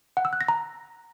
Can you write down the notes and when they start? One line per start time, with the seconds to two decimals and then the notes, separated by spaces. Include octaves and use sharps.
0.17 F#5
0.25 E6
0.33 F#6
0.41 A#6
0.48 A#5